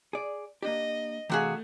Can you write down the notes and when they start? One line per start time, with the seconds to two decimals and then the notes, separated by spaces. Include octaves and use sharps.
0.13 G#4 D5
0.63 A#3 D4 G4 D#5
1.30 C3 E3 A3 F#4 G#4 F5